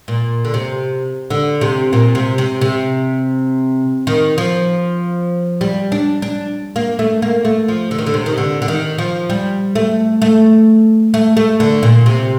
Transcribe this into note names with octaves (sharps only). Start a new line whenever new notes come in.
A#2
D3
C3
D3
C3
A#2
C3
C3
C3
D#3
F3
G3
D4
D4
A#3
A3
A#3
A3
F3
D3
D#3
D3
C3
D#3
D3
D3
D#3
F3
G3
A3
A3
A3
A3
D3
A#2
C3